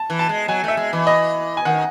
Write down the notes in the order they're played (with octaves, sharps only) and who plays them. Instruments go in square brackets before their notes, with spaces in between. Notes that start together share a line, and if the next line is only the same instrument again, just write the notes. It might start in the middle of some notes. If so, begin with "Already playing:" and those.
Already playing: [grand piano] A5
[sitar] E3
[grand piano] A5
[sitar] G#3
[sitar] F#3 [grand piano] G#5
[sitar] A3 [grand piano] E5
[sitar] G#3
E3
[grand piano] D#5
G#5
[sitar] D#3 [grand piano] F#5